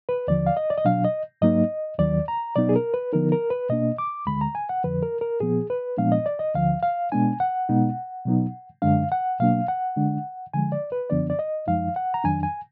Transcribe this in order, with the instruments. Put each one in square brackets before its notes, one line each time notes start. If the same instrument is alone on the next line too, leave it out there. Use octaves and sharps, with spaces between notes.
[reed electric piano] B4
D#2 D3 F3 D5
F5
D#5
D5
D#5
B2 F#3 D4 F5
D#5
G#2 F#3 A#3 D#4 D#5
D#2 D#3 F#3 D5
A#5
B2 F#3 B3 D#4 D5
G#4
A#4
B4
D3 F3 B3 D#4 A#4
A#4
B4
B2 A#3 D4 D#5
D6
D2 D3 G#3 B5
A#5
G#5
F#5
F2 D3 F3 B4
A#4
A#4
A#2 F3 B3 G#4
B4
A#2 F3 G#3 B3 D4 F5
D#5
D5
D#5
D2 D3 F3 F5
F5
B2 G#3 B3 D4 G#5
F#5
B2 G#3 B3 D#4
B2 F#3 B3 D#4
F#2 D3 G#3 D4 F5
F#5
B2 F#3 A#3 D4 F5
F#5
D3 G#3 D4
D3 F3 G#3 G#5
D5
B4
F#2 D3 F3 B3 D4 D5
D5
D#5
F#2 F3 G#3 D#4 F5
F#5
A#5
F2 D#3 F#3 D4 G#5
G#5